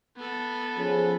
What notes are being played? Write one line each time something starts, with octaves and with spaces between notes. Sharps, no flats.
B3 A4
F3 C#4 G#4